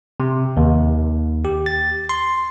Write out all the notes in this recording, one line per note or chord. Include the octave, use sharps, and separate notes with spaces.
C3
D#2
G4
A6
C6